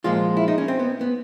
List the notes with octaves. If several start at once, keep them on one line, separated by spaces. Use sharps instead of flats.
A#2 F3 G#3 F4
E4
D#4
C#4
C4
B3
B3